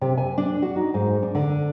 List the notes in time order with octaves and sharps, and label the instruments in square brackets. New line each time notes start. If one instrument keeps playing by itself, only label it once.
[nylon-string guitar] C3
G#5
D4
F#4
D#4
G#2
D4
D3